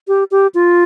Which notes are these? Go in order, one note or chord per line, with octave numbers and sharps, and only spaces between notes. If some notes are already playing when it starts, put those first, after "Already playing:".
G4
G4
F4